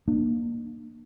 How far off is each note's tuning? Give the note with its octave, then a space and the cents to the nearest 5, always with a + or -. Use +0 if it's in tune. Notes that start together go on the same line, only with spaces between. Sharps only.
A#3 +10 D4 +40